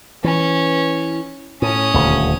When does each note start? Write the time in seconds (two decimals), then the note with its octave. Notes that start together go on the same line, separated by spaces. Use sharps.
0.24 E3 C#4
1.62 A2 C#4 D#6
1.94 D#1 D2